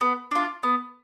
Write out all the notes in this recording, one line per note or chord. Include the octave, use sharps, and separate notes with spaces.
B3
D4 F4
B3